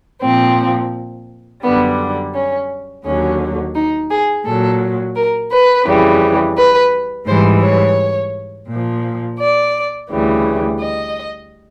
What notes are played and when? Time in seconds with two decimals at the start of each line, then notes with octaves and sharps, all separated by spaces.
0.22 A#2 F3 C4
1.63 F#2 D3 G3 B3
2.34 C#4
3.04 D#2 D3 F#3 C#4
3.75 D#4
4.10 G#4
4.45 A#2 F#3 A4
5.15 A#4
5.51 B4
5.86 F2 C#3 E3 G3
6.57 B4
7.27 G#2 E3 G3 C5
7.62 C#5
8.68 A#2 F3
9.39 D5
10.09 D2 C#3 E3 G3
10.80 D#5